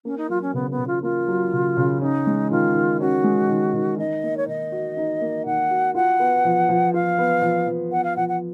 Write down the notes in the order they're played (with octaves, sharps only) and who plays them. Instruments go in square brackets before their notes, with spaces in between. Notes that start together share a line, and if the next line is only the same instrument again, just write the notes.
[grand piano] A#3 [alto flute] C#4
[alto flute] D#4
[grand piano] F#3 [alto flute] F4
[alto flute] C#4
[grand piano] C#3 [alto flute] B3
[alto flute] B3
[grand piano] C#3
[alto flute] F4
[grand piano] A#3 [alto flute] F4
[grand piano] F#3
C#3
C#3
[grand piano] C#4 [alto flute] D#4
[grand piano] G#3
[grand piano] D#3 [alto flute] F4
[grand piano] D#3
[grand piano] C#4 [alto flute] F#4
[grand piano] G#3
D#3
D#3
[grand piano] D#4 [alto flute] D#5
[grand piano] A#3
[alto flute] C#5
[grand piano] D#3 [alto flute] D#5
[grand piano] F#4
D#4
A#3
[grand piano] D#3 [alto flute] F#5
[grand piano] F#4
[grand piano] F4 [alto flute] F#5
[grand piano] B3
F3
F3
[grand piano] F4 [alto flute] F5
[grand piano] B3
F3
F3
[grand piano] B3 [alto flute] F#5
[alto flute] F5
[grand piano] F3 [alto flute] F#5
[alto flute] F#5